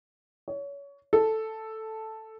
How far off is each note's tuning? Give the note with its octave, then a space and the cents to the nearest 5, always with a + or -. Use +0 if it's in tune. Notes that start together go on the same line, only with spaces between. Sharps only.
C#5 +25
A4 +0